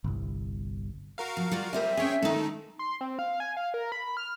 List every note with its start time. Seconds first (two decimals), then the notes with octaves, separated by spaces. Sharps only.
0.04 G1 C2
1.18 F#4 A#4 F5
1.37 F3
1.51 G3 F4 D5
1.73 G3 C4 A#4 C5 E5 G#5
1.97 C4 C#4 G#4 C#5 G5
2.22 D#3 G#3 A3 D#4 A4
2.79 C6
3.01 C4
3.19 F5
3.40 G#5
3.57 F5
3.74 A#4
3.92 B5
4.17 F6